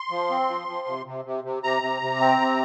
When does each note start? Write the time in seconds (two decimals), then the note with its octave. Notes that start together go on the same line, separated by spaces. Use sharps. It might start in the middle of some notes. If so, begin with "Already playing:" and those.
Already playing: C6
0.10 F3
0.30 C4
0.49 F3
0.68 F3
0.87 C3
1.06 C3
1.25 C3
1.44 C3
1.63 C3 A#5
1.82 C3
2.02 C3
2.20 C4
2.40 C3